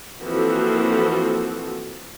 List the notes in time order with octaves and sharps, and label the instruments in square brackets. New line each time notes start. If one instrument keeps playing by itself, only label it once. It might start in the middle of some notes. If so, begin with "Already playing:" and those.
[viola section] E3 F3 A#3 C4 F#4 A4